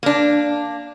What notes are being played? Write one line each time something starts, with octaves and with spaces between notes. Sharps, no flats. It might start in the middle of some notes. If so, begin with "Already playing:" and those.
A#3 D4